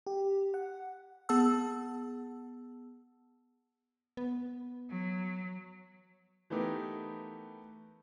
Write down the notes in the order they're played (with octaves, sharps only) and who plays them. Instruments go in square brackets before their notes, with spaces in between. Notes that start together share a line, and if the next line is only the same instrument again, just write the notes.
[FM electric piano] G4
F#5
[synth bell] B3 G#4 F#5 A5 E6
[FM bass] B3
[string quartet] F#3
[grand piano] E3 A3 B3 D#4 G4 A#4